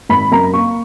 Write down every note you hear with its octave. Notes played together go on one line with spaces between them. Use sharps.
G#1 B5
F#2 A#5
A#3 C#6